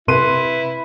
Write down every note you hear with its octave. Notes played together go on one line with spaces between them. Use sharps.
C3 E4 B4 C6 D#7